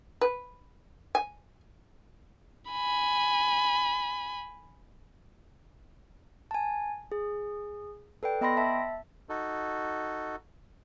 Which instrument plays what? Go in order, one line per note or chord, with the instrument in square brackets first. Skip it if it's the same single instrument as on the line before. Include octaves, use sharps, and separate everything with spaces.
[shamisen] B4
G#5
[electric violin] G#5 B5
[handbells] G#5 A5
G#4
A4 B4 D5 G5
B3 D#5 G5 B5 C6 A#6
E5 A5
[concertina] D#4 F#4 A4